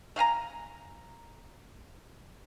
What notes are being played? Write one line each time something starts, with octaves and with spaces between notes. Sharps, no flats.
A3 F5 G#5 A#5